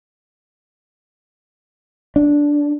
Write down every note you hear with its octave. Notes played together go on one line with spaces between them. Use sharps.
D4